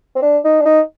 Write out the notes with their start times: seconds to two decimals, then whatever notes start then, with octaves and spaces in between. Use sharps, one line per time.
0.15 C4
0.22 D4
0.44 D#4
0.60 D4
0.65 D#4